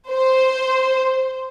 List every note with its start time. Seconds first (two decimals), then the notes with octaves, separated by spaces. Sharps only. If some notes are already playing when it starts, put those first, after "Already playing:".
0.10 C5